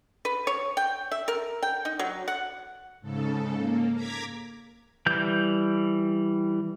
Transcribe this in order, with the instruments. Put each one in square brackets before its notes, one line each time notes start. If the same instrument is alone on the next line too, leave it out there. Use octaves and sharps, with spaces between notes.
[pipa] B4
C#5
G5
E5
A#4
G5
D#4
F#3
F#5
[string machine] G#2 C#3 A4
A#3
A#5 D6 G#6 B6
[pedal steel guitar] E3 G3 G6